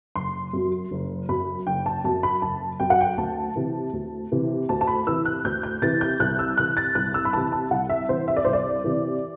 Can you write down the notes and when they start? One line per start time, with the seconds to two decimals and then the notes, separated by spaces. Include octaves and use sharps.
0.15 F#1 C6
0.53 F#2 F#3
0.91 F#1
1.29 F#2 F#3 B5
1.67 F#1 G5
1.86 A5
2.04 F#2 F#3 A5
2.23 B5
2.42 F#1 A5
2.80 F#2 F#3 G5
2.90 F#5
3.01 G5
3.17 D2 A5
3.56 C3 E3
3.93 D2
4.32 C3 E3
4.69 D2 A5
4.81 A5
4.87 B5
5.07 C3 E3 E6
5.25 F#6
5.44 D2 G6
5.63 G6
5.82 C3 E3 A6
6.01 G6
6.20 C2 F#6
6.39 E6
6.58 C3 E3 F#6
6.77 A6
6.95 C2 F#6
7.14 E6
7.25 B5
7.33 C3 E3 A5
7.52 A5
7.71 C2 F#5
7.89 E5
8.08 C3 E3 C5
8.28 E5
8.37 D5
8.45 C2 C5
8.53 D5
8.84 C3 E3